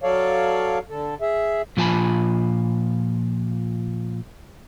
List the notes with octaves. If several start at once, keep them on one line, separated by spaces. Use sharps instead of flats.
F#3 A4 C#5 D5 F5
D3 A4
G#4 E5
A#2 F3 F4 G#5 A5 B5